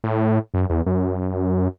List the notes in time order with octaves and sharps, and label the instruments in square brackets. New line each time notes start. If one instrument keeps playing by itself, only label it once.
[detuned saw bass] A2
F#2
E2
F#2